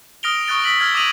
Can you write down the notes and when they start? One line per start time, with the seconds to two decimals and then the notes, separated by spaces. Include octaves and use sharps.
0.23 D#6 F6 A#6 D7 F7 G7
0.47 C#6 D#6 F#6 A6 D7
0.64 D#6 E6 B6 F#7
0.79 E6 F6 G#6 A#6
0.95 D6 D#6 A#6 D#7 F7 F#7